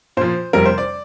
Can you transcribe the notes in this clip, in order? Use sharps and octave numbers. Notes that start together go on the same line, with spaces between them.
A#2 F3 C5
F2 C3 G3 A#4
C5
D5